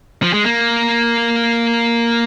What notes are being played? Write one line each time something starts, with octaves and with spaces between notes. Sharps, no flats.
F3
G#3
A#3